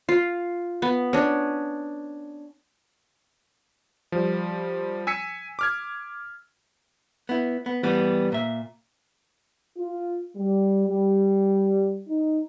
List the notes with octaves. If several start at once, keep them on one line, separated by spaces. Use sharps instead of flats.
F4
B3
C#4 D4
F3 G3
G#5 E6 B6 C#7
D6 F6 G#6
B3 E4
B3
E3 G3 B3
A#2 E5
F4
G3
G3
D#4